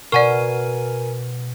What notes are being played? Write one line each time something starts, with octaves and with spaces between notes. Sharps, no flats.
B2 A#4 D5 F#5 G#5 C#6